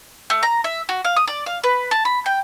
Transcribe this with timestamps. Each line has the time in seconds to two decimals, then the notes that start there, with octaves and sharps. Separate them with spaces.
0.30 A3
0.43 A#5
0.64 E5
0.89 F#4
1.05 F5
1.16 D#6
1.28 D5
1.46 F5
1.64 B4
1.91 A5
2.05 B5
2.26 G5